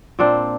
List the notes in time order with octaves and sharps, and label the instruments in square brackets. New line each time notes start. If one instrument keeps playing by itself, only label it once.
[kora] A#2 C4 D4